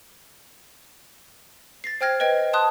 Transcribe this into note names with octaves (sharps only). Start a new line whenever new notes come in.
A6 A#6 C7
C5 G5 F6 G#6 A#6
B4 D#5 G5 G#6
A5 C6 D#6 F#6